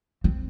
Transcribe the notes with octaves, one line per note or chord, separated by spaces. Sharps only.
C4